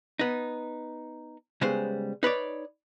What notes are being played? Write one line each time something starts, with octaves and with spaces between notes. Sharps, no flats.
B3 D#4
C#3 G3 G#3 B3 C5
D#4 B4 C#5 D5